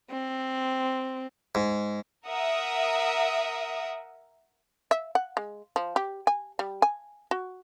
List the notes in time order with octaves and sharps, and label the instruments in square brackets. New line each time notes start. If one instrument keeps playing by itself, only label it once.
[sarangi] C4
[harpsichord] G#2
[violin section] A#4 E5 F#5 D#6
[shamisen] E5
F#5
G#3
F3
G4
G#5
G3
G#5
F#4